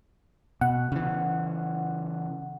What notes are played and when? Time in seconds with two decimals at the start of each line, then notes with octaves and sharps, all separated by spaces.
0.61 B2 F#5
0.92 C#3 E3